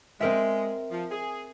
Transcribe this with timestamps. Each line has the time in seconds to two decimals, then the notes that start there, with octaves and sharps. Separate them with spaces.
0.20 G#3 C4 A#4 E5
0.91 F3
1.11 G#4